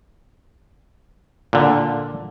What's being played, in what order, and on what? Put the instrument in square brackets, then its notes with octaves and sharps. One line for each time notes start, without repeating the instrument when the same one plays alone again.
[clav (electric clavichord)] A#2 D3